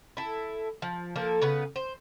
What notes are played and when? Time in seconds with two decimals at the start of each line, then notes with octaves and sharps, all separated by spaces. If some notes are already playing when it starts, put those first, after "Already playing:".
0.17 E4 A4
0.82 F3
1.16 F3 A#3 A4
1.42 C#3 B3 B4
1.76 C5